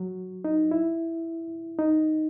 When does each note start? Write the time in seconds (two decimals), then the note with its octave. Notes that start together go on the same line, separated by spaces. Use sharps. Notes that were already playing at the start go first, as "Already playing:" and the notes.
Already playing: F#3
0.45 D#4
0.71 E4
1.78 D#4